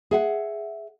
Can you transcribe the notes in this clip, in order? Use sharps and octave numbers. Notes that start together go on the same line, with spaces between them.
G#4 E5 F#5